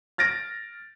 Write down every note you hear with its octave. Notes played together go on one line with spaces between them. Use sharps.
F6 A6 A#6 D7